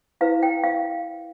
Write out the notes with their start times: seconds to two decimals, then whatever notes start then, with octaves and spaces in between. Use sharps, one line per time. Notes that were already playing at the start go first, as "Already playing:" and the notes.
0.21 E4 B4 F5
0.43 G5
0.64 F5